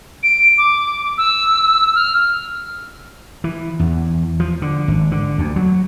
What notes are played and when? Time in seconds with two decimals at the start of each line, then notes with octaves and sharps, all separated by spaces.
0.23 D7
0.58 D6
1.18 E6
1.95 F6
3.44 E3
3.80 E2
4.40 F3
4.62 D3
4.88 G#1
5.12 D3
5.38 D2
5.56 F#3